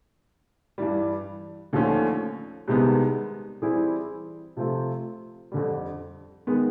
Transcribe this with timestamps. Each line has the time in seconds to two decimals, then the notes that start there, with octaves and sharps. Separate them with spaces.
0.78 G2 E3 G3
1.73 D#2 D3 F3 A3 C#4
2.68 C2 C3 D#3 G#3 B3
3.62 E3 G3 C4 E4 G#4
4.57 C3 F3 A3 C4 F4
5.52 F2 D3 G3
6.47 D#3 G#3 B3